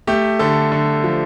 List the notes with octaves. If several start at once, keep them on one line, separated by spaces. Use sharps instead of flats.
A3 G4
D3 A4
D3
F3